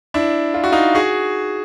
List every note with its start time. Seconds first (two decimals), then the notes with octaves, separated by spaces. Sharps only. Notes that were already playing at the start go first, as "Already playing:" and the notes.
0.14 D4 E4
0.54 F4
0.64 F#4
0.72 D#4 F4
0.95 F#4 G#4